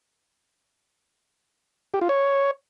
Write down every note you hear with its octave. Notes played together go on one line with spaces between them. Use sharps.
G4
F4
C#5